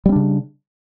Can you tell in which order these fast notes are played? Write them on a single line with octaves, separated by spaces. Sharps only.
G3 C4 D4 C#3